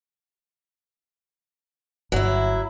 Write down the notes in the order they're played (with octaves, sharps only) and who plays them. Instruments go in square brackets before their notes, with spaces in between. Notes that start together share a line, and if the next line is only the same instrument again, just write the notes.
[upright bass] G1 [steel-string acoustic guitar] F#3 E4